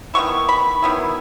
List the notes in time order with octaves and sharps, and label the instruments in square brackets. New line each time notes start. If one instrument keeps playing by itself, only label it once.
[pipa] D#3 F#3 B3 E4 C#6
B5
D#3 F#3 B3 E4